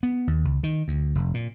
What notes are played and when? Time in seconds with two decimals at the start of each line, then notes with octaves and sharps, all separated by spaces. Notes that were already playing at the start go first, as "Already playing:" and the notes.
0.03 B3
0.27 D#2
0.45 C#2
0.63 D#3
0.88 D2
1.15 F1
1.34 A#2